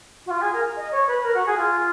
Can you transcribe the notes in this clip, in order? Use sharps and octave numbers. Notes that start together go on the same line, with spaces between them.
F#4
F4
G#4
A#4
D#5
C#5
B4
A#4
F#4
G#4
F4